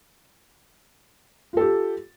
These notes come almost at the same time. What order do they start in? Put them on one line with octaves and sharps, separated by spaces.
F4 A4 G4